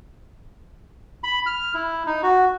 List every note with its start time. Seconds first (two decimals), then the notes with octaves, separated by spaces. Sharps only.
1.24 B5
1.46 F6
1.74 E4
2.06 D#4
2.23 F#4